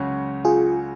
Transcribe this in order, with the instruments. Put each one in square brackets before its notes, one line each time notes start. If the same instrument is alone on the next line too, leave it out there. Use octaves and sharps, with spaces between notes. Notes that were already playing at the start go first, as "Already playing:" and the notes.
Already playing: [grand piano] C#2 C#3 F#3 C#4 F#4
[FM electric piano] F4 G#4